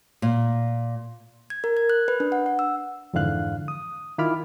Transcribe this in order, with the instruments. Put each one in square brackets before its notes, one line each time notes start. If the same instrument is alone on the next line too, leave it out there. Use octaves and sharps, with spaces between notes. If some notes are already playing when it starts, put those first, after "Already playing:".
[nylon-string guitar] A#2
[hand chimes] G#6
A#4
G#6
F#6
B4
D4
F#5
F#5
E6
[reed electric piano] F2 G#2 D3 E3 F5 F#6
D#6
D#3 E4 F4 B5 D6 F6